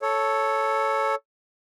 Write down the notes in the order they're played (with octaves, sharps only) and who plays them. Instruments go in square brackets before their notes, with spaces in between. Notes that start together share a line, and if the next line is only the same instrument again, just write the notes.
[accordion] A4 C#5